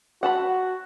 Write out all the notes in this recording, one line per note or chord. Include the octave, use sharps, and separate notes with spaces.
F#4 F#5 A5 B5